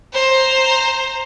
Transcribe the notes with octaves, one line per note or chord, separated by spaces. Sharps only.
C5 A#5